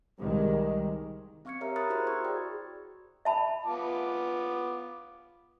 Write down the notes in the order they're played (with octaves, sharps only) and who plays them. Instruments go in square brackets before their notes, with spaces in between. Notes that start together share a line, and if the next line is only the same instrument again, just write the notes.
[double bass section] C2 D#3 G#3
[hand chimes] C4 F5 C#6 F6 G#6 C#7
G4 A#4 C#5 E5 A#5 F6
A#5 B5 D#6 F6 F#6 A6
E4 F#4 G#4 C5 B5 C6
F#4 C#6 E6 G#6
G#4 D5 G5
[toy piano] E5 A5 B5
[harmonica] B3 F4 D6